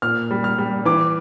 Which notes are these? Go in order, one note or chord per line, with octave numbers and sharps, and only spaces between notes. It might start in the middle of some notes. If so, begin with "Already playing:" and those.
A#2 F6
G3
F6
G3
E3 D6